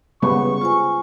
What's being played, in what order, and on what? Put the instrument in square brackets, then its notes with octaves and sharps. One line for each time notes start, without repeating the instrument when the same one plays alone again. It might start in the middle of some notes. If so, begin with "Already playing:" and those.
[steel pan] C#3 G3 B3 [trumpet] C#6
[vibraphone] F4 C5 G#5